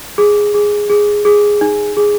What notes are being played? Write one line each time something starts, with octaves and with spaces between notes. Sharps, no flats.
G#4
G#4
G#4
G#4
D#4
G#4